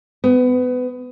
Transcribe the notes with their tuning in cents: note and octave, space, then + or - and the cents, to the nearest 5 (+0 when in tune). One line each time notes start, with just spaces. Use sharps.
B3 +25